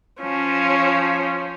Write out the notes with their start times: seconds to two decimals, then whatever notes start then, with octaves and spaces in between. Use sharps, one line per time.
0.21 F3 C#4